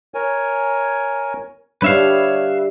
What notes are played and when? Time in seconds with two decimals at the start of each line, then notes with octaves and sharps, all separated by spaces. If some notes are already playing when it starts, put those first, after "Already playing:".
0.14 A#4 C#5 G#5
1.82 G3 D4 B4 C#5 E5 F5